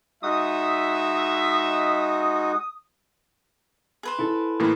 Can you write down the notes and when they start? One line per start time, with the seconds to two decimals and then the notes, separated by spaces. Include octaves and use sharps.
0.23 G#3 D#4 F#4 E5 D#6
4.03 G#4 B4 C5
4.18 E4 A4
4.59 A2 E3 A#3 F6 A6 A#6